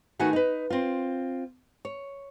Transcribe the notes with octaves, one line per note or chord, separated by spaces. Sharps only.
D#3 A3 B3 F#4 G#5
D#4 B4
C4 F4
C#5